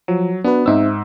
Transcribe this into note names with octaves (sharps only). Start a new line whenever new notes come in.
F3 F#3
B3 D4 F#4 B4
G#2 C4 D#4 E5 E6